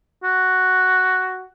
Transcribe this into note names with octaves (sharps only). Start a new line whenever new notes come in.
F#4